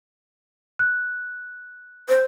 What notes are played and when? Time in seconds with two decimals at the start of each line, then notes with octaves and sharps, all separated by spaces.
0.79 F#6
2.09 C5